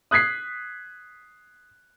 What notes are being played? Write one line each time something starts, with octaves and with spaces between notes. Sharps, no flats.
D#6 F#6 G#6 B6 C7